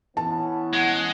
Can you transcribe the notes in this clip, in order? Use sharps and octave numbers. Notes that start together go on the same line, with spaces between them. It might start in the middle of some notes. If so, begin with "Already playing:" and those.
E3 B3 C#4 A5
G#3 F#5